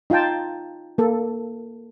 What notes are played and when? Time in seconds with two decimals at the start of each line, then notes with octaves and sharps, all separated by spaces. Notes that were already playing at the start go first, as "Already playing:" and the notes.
0.10 D#4 F4 F5 G5 A5
0.98 A#3 A4